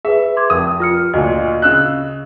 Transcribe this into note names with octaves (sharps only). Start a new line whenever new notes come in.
G#4 B4 E5
C6 D6 G#6
F1 A#4 D#6
F4 F6 C#7
D2 A#2 D#5
C#3 E6 F#6